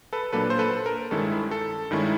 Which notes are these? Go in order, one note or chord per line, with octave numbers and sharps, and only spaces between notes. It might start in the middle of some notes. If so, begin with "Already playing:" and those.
A4 B4
A#2 F#3 A#3 D4 A4 B4
C5
A4 B4
A#4
G2 D#3 G#3 C#4 E4 A4
A4
G2 D#3 G#3 C#4 E4